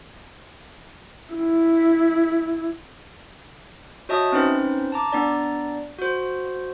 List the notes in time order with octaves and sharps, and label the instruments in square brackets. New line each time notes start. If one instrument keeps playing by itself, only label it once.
[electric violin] E4
[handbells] F#4 C#5 D#5 E5 A5 D#6
C4 C#4 D#4 B4 C5
A5 A#5 D6
B3 D4 D5 A#5
F#4 C5